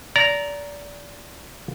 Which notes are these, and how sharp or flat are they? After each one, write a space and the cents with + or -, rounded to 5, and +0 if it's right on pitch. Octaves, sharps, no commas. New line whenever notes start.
D5 -25 A#5 +0